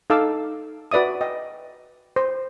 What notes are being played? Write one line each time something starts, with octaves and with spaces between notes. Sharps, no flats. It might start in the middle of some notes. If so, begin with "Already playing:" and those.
D#4 A4 F5 A5 D6 E6
F#4 B4 D5 E5 D#6
D#5 G5
C5